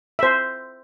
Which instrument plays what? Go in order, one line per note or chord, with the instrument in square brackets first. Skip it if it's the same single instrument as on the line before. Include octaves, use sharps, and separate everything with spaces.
[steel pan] C5 E5